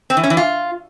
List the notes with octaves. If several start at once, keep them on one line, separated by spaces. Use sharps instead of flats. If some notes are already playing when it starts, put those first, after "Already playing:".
C4
E3
C#4
E3
F4